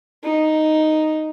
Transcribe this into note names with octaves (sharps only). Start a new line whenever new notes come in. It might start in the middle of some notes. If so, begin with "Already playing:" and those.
D#4